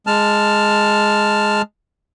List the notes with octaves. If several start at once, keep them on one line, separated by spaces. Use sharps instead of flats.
G#3 A5 F6